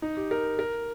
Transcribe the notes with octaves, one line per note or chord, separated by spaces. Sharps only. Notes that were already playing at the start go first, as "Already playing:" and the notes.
D#4
G4
A#4
A#4